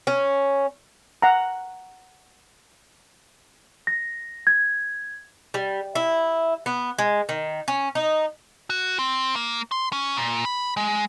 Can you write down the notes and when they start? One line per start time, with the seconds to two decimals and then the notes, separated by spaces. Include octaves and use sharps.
0.07 C#4
1.22 F#5 A#5
3.87 A#6
4.47 G#6
5.54 G3
5.95 E4
6.66 B3
6.98 G#3
7.29 D#3
7.68 C#4
7.95 D#4
8.70 F#4
8.99 C4
9.36 A#3
9.72 C6
9.93 C#4
10.17 A#2
10.45 B5
10.77 G#3